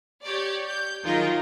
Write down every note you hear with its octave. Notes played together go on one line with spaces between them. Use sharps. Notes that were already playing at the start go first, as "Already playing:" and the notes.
G4 C#5 D5
G6
D#3 F#3 D#4 F4 G#4 A#4